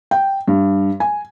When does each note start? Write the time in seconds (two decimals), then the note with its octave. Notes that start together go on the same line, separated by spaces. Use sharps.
0.11 G5
0.48 G2
1.00 G#5